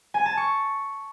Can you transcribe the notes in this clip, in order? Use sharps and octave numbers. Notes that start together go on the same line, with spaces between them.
G#5
A5
C#6